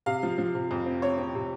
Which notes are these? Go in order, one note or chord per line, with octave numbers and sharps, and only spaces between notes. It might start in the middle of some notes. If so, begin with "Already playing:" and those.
C3 F5
F3
F3
C3
F2
C4
C4 C#5
C4
C3